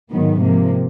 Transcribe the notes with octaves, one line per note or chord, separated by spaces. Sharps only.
G#2 D#3 F#3 B3
C3 F3 A#3